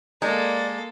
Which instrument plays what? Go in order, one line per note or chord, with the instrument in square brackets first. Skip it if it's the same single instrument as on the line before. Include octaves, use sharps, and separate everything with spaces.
[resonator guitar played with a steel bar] G#3 [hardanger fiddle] A#3 A4 [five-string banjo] D#4 [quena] D5